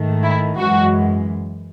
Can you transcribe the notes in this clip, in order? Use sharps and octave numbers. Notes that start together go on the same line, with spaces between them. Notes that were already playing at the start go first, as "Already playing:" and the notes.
Already playing: G#2 D#3 A3
E4
F#2 E3 G#3 F#4